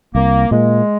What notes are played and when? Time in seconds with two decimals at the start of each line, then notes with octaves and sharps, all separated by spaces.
0.15 C2 A#3
0.51 A#2 G#3 A#3